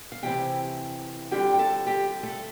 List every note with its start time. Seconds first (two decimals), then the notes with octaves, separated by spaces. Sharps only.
0.12 F5
0.23 C3 E3 A3 C4 E4 G4 G5
1.31 D3 G3 C4 F4 G4 G5
1.54 G5
1.59 A4 A5
1.87 G4 G5
2.23 A3 A4